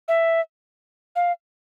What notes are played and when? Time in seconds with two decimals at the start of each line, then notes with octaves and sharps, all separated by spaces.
0.08 E5
1.16 F5